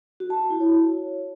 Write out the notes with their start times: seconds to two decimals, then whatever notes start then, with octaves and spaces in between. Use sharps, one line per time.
0.20 F#4
0.30 A5
0.40 F#4
0.50 E4
0.60 C#5